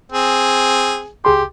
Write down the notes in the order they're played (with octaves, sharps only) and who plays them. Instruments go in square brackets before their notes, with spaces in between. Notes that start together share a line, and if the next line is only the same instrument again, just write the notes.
[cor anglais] C4 [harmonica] G#4
[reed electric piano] C#2 G#4 C6 [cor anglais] G4